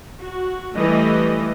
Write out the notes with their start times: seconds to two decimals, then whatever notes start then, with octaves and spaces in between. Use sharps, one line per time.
0.21 F#4
0.76 E3 G3 A3 D#5